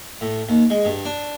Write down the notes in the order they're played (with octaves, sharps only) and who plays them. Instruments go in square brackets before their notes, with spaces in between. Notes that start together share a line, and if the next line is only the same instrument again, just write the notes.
[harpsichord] A2
D#2
G#3
G2
D4